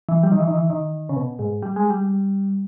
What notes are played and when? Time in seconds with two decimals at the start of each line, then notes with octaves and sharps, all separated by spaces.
0.09 E3
0.23 G3
0.32 D#3
0.39 E3
0.47 D#3
0.54 E3
0.70 D#3
1.09 C#3
1.16 B2
1.39 G#2
1.63 G3
1.76 G#3
1.90 G3